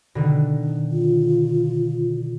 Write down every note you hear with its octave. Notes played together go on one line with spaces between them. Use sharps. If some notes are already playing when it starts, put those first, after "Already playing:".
B2 D3 D#3
F4